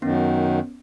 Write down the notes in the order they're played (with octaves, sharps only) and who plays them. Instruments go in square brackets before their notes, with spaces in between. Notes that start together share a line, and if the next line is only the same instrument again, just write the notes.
[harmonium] F#2 D#3 [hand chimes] B3 C#4